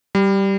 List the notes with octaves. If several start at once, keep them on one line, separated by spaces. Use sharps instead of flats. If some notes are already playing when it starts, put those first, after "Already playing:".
G3